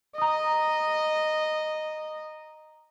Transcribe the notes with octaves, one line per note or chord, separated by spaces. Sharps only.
D#5 A#5 D#6